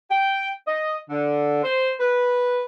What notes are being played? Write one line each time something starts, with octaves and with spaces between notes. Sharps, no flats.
G5
D#5
D3
C5
B4